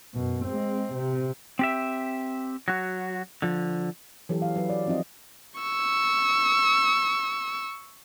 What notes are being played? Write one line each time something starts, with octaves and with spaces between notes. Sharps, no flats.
F#2 B2
G#3 C4
C3
C4 G4 E5
F#3 F#4
D3 F3
E3 F#3 G4 A4
F5
F#3 B4
D5
F3 C4 D#4 F4 D#5
C#6 E6